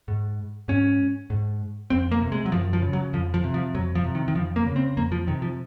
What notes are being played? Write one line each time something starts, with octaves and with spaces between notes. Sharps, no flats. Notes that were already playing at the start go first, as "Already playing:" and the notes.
G#2
G#2 C#4
G#2
F2 C4
A#3
C3
G#3
F#3
F#2 F3
F3
C#3
F#3
F2 F3
F3
C3
F3
F2 F#3
F3
C3
D#3
D#3
F2 F3
A#3
C#3
C4
F2 A#3
F3
C3 D#3
F3